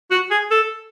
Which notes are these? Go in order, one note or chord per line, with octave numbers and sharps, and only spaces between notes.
F#4
G#4
A4